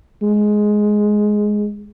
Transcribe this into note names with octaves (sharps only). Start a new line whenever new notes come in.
G#3